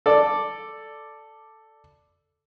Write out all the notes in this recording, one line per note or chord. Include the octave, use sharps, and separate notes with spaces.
A4 D5